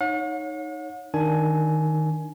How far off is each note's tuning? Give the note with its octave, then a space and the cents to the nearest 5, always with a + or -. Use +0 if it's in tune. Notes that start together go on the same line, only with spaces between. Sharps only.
D#4 +0 C#5 +0 F#5 -45
D#3 +0 D4 +0 G#5 +15